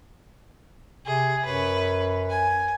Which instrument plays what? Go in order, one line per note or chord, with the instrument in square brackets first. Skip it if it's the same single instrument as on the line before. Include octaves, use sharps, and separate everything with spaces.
[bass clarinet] C3 [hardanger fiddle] G#4
[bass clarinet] F#2 [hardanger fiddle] B4 C#5
[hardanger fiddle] G#5